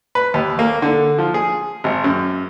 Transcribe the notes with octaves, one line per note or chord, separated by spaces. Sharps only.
B4
D#2
A#3
D3
F3
G#4
G#1
F#2